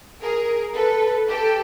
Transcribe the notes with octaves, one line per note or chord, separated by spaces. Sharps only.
G#4 A#4
A4 B4
G4 A4